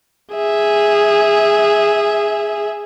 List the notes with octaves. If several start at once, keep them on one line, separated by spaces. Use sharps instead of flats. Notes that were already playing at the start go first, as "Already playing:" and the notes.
G#4 E5